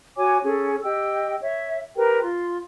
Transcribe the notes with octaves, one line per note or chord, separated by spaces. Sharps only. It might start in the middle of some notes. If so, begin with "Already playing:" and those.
F#4 C#5 G#5 D6
C#4 G#4 A4
G4 D#5 G5 E6
C#5 E5
G4 A#4 B4 G5
F4 C6